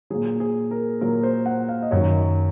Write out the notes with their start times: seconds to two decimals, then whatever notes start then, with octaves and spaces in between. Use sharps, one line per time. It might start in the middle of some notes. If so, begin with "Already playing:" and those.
0.10 A#2 F#3 G#4
0.40 G#4
0.71 A#4
1.01 A#2 F#3 A#4
1.23 C5
1.46 F#5
1.69 F5
1.82 D#5
1.91 F#2 D#3 F#3 C#5